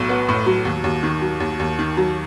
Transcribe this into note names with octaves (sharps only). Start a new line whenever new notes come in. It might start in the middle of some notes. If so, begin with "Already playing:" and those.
Already playing: B1 A2 F#3
B3
A2
F#3
D#2
D#2
D#3
F#3
D#2
D#2
D#3
F#3